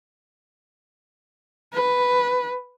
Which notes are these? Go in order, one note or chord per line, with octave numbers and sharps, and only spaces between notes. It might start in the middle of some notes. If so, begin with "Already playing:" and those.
B4